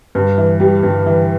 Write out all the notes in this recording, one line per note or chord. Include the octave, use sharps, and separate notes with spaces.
G2
E3
G3
G2
E3